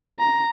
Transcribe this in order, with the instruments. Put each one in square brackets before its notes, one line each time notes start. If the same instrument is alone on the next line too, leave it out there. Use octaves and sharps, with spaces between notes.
[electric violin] A#5